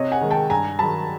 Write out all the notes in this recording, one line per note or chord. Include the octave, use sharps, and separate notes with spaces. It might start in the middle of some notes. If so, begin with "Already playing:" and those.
Already playing: C3 C#5 D#5
F#5 G#5
D#3 G#3
G5 A5
G2 G#5 A#5
D#3 F#3 A5 B5